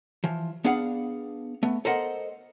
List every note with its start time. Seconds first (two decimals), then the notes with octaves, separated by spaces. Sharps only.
0.24 E3 F3
0.65 B3 D4 G#4 F5 F#5
1.63 A3 B3
1.85 A4 A#4 C5 D#5 F#5